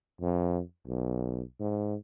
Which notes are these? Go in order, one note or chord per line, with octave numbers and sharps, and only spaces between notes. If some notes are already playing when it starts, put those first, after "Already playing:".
F2
B1
G#2